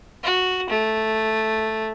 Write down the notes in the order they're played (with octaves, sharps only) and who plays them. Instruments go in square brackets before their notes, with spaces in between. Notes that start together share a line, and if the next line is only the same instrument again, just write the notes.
[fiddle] F#4
A3